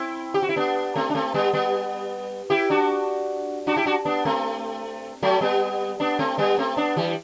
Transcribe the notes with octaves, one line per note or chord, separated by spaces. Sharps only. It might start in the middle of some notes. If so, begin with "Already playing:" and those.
Already playing: C4 E4
G4
F#4
E4
B3 D4
A3 C4
D4
A3 C4
G3 B3
G3 B3
E4 G4
D4 F#4
D4 F#4
E4 G4
D4 F#4
B3 D4
A3 C4
F#3 A3
G3 B3
B3 D4
A3 C4
G3 B3
A3 C4
B3 D4
E3 G3